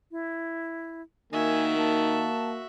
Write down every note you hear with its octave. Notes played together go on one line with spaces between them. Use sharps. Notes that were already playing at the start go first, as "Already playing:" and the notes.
E4
D#3 A#3 F#4 E5 G#5
A#3 A5